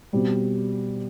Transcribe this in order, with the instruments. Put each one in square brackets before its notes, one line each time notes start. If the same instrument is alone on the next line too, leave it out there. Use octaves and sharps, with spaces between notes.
[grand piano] B2 G3 C4